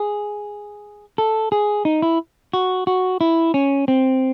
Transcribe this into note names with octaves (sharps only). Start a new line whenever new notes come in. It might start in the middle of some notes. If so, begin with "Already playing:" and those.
Already playing: G#4
A4
G#4
D#4
E4
F#4
F#4
E4
C#4
C4